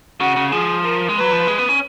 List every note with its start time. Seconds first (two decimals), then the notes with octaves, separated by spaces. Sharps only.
0.20 C#3 F#4
0.36 C#3
0.52 F3 G#4
0.84 A#4
1.09 G#3
1.16 F#3 B4
1.32 F3
1.47 G#3
1.59 B3
1.69 C#4